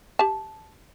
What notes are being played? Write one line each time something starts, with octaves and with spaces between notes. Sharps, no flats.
G4 A5